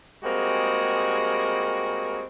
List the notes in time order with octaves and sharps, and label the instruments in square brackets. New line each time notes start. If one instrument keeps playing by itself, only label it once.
[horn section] G3 G#3 A#3 C4 F#4 G#4